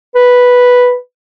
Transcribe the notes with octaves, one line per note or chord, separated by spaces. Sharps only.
B4